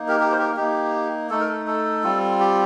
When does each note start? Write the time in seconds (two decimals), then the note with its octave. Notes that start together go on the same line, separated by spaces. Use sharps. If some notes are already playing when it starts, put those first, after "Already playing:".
Already playing: A#3 D#4
0.08 G4 A#4
0.20 G4 A#4
0.32 C5
0.38 G4 A#4
0.57 A#3 D#4 G4
1.30 A3 D#4 A4
1.40 A#4
1.49 A4
1.67 A4
2.03 G3 C4 F4
2.40 G4